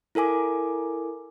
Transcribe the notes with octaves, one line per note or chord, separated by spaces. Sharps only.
E4 A4 A#4 G#5 D6